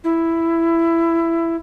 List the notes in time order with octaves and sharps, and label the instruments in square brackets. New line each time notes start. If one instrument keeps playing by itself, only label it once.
[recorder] E4